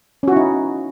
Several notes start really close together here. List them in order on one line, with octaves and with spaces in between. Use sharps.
C#4 F#4 E4 D#4